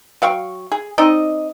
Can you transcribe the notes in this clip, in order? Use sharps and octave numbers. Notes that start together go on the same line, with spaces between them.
F#3 F5 G5 C#6
G#4
C4 D#4 D5 D#5